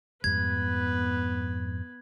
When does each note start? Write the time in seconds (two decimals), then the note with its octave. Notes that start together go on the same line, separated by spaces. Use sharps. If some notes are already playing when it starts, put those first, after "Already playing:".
0.24 F2 G#2 G3 B3 B4 G#6